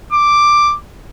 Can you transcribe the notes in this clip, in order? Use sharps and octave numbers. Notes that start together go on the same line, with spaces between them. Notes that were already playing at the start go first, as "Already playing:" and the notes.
D6